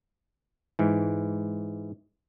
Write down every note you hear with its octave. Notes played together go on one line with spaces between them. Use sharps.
G#2 E3